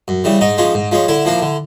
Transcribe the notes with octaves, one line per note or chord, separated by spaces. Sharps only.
F#2
C#3 E3 G3
G#2 D#4
F3 G#3 C#4
G#2
F3 G#3 C#4
D3 E4
F3 A#3 D4
D3